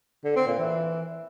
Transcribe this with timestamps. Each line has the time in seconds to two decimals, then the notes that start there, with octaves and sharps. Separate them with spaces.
0.25 D3
0.36 C4
0.47 A#2
0.59 E3